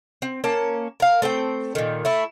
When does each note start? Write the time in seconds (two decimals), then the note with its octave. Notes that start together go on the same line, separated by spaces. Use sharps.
0.22 C4
0.44 A#3 C#4 A5
1.00 A#4 F5
1.22 A3 C4 C5 G5
1.75 A#2 D#3
2.05 A3 E4